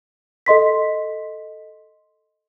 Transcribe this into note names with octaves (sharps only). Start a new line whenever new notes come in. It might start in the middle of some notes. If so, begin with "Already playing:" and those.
A4 D#5 C6 B6